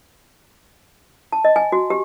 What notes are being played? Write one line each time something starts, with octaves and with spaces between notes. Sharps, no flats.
A5
D#5
G#5
F#4
G4